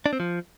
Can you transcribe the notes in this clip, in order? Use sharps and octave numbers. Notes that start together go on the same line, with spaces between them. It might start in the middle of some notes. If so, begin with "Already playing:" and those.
D4
C4
F3